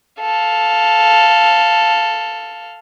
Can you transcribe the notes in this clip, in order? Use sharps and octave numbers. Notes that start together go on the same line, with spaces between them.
A4 F5